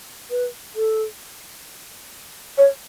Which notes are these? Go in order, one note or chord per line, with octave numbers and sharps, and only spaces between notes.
B4
A4
C#5